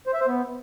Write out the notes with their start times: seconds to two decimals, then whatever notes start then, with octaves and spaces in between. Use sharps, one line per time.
0.07 C5
0.14 E5
0.20 C5
0.27 B3